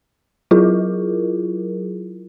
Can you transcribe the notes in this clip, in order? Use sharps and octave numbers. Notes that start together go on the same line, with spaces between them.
F#3 E4 F4 G#4 A#4